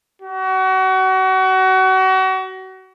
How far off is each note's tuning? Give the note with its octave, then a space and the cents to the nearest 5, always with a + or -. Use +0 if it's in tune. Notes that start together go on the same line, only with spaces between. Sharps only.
F#4 +30